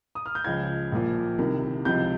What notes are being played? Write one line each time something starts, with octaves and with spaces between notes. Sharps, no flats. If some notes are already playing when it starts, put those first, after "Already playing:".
D#6
F6
G6
C#2 C#3 F3 G#6
A#1 A#2 F3
C2 C3 D#3
C#2 C3 F3 G6